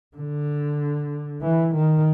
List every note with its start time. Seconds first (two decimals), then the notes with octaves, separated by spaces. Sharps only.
0.17 D3
1.42 E3
1.75 D#3